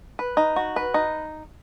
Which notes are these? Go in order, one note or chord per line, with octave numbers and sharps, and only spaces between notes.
B4
D#4
F#4
B4
D#4